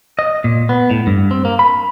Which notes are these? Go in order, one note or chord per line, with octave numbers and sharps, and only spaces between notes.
D#5
A#2
B3
A2
G2
C4
A#3
B5